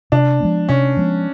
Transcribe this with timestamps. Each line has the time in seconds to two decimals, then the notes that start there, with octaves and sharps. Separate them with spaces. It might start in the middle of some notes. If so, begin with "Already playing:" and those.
0.12 C3 D4
0.40 F3 G#3 B3
0.69 C3 C#4
0.97 F3 G#3 B3